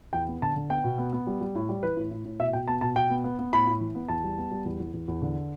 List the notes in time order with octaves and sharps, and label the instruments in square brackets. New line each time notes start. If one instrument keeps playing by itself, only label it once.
[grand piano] E2 G5
B3
D3 A5
D3
B3 G5
B2
B3
B3
G3
G3
A2
G3
E3 B4
A2
A2
A2
B2 E5
B2 G5
B3 A5
B2 A5
B2 G5
B3
B3
B3
A2 B5
A2
E3
B3
E2 A5
G3
B3
G3
E2
E2
E2
E2
D3